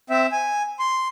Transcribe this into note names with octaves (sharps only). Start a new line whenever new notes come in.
C4 E5
G#5
C6